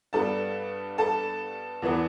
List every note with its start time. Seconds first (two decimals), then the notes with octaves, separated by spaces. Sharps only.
0.13 G2 G3 B3 A4 A5
0.98 A4 A5
1.82 E2 E3 B3